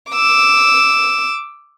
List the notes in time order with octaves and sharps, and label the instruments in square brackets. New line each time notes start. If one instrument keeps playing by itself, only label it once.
[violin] D6 E6